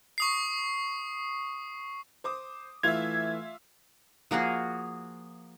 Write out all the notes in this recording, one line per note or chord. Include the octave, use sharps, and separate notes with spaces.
C#6 D#6 C7
C5 D6 D#6
E3 A3 F4 E5 G#6 F7
F3 A#3 F#4 G#4